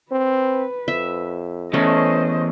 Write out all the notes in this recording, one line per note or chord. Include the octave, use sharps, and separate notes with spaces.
C4 B4
F2 E5
E2 A3 C#4 C5 D#5